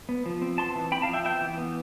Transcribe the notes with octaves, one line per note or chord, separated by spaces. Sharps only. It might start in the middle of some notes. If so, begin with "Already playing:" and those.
B3
F3
C4
B3 A5 C6
E3
C4 G5 B5
F5 A5
F3
E5 G5
B3 E5 G5
E3
B3